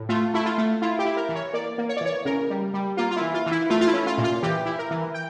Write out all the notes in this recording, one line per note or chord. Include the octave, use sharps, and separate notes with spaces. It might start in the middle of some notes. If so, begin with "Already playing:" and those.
Already playing: A2
A3 F4
A3 E4
F4
A3
E4 F4
G4
E4
A#4
E3
C#5
A#3 D5
A#3
C#5
D5
E3 C#5
C#3 A#4
G3
G3
A#3 F4
F4
E3 E4
F4
E3
E4
A3 F4
F4
E4
C#4
F4
A#2
F4
E3 G4
E4
A#4
E3
G5